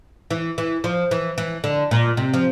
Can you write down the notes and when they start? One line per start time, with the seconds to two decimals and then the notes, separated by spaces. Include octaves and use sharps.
0.31 E3
0.58 E3
0.84 F3
1.11 E3
1.38 E3
1.64 D3
1.91 A#2
2.17 C3
2.34 F3